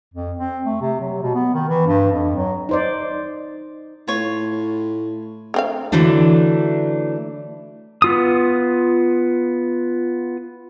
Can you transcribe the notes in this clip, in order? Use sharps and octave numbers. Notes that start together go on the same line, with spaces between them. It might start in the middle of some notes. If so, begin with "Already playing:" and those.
F2
C4
A3
C3
F#3
B2
B3
D#3
E3
G2
F2
F#3
D#4 C5 D5
A2 F4 C#5
D3 C4 F5
D3 E3 F#3 A3 D4
B3 F4 D#6